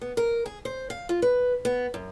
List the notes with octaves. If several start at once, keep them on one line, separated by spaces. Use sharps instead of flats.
B3
A#4
G#4
C5
F5
F4
B4
B3
F#2